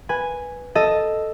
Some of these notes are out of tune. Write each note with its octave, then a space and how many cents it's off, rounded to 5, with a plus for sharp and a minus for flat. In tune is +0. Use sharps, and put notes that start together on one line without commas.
B4 +0 G#5 -5
A4 +0 D#5 +0